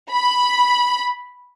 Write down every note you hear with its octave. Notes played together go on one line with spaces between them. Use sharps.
B5